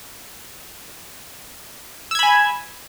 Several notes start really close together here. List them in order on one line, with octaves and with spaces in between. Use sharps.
E6 G#6 B5 G#5